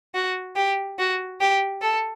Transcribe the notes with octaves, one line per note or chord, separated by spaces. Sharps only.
F#4
G4
F#4
G4
A4